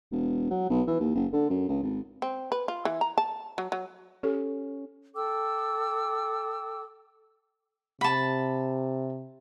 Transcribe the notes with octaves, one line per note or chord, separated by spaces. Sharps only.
E1
F#3
B1
E3
D#2
F#1
D3
F#2
C#2
G#1
C4
B4
F4
E3
A#5
A5
F#3
F#3
C#4 G4 A4
A4 G5 D6 E6
C3 A5 B5